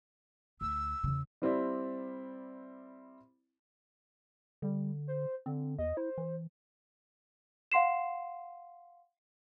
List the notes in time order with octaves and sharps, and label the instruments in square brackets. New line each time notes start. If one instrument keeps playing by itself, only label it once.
[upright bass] D2 [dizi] E6
[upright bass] E2 C#3
[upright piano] G3 C4 E4 D5
[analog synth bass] D3 [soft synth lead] G3
[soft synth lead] C5
[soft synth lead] D3 [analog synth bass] C4
[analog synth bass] E2 [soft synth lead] D#5
[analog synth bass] E4 [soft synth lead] C5
[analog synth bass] E3
[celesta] F5 F#5 C6 C7 E7